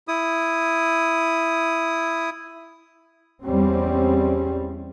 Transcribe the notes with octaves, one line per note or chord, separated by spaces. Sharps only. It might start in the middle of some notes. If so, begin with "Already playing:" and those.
E4 D#6
E2 G3 C4 C#4